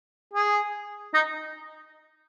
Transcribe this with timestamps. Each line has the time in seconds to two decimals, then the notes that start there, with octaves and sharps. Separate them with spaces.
0.33 G#4
1.14 D#4